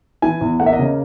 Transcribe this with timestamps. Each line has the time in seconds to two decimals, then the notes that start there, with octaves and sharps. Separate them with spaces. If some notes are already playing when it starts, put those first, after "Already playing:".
0.22 E3 G#5
0.41 E2
0.60 A#3 F#5
0.66 E5
0.73 D#5
0.79 C#3